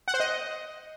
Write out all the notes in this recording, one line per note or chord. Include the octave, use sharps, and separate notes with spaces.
F#5
C5
D#5